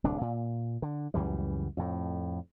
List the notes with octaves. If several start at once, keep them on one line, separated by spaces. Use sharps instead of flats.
D1 C2 D4
A#2
D3
C#2 F#2 E3 G3
F2 A2